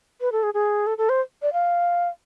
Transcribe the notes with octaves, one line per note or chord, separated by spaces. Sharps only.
B4
A4
G#4
G#4
A4
A4
C5
D5
F5